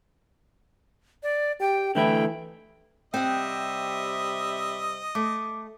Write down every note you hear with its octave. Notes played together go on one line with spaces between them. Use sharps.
D5
G4 G5
D3 E3 A3 E4 G5
C3 G3 C4 D#5 E5 F#5 G5
A3 D6